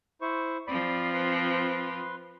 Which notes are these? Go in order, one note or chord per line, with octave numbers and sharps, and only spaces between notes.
E4 C5 C#6
F3 C4 D5 B5
B4 C6